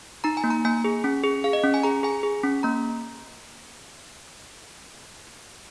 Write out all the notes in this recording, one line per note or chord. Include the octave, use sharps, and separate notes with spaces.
D#4 A#5
G#5
A#3
A#5
A#3 G#5
G#4
C#4
G#4
G#4 F5
D#5
C#4
G#5
G#4 A#5
G#4 G#5
G#4
C#4
A#3 A#5